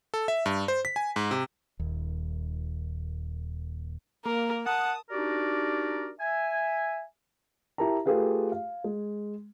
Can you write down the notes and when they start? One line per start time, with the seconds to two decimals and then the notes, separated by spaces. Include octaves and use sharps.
0.14 A4
0.28 E5
0.46 G2
0.68 C5
0.85 B6
0.96 G#5
1.16 G#2
1.31 C3
1.80 D#1 D#2
4.25 A#3 A#4
4.66 F#5 A5 D#6
5.10 D4 D#4 F#4 G4 A#4 D5
6.20 E5 G#5
7.78 E4 G4 A#4 A5 A#5
8.05 A3 F4 G4 G#4 B4 F5
8.52 F5
8.84 G#3